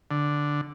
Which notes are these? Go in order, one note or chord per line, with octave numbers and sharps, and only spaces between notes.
D3